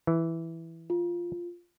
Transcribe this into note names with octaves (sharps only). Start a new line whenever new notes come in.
E3
F4